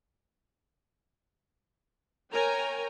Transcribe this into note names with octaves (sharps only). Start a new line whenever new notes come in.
A#4 C#5 G5 G#5 A#5